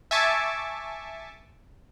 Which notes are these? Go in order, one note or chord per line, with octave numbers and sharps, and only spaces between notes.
E5 G#5 A5 C#6 D6